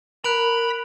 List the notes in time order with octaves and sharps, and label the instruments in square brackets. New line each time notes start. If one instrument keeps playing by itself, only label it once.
[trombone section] A#4 [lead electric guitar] B5 [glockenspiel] F#6 D7 F7